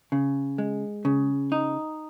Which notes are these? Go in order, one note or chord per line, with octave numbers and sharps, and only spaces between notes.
C#3
G#3
C#3
D#4